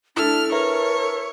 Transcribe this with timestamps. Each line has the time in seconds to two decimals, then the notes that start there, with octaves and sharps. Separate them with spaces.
0.17 D4 E4 A4 F6
0.52 A#4 B4 C#5 E5 A#5